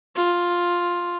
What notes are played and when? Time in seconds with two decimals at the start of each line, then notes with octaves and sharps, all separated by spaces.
0.16 F4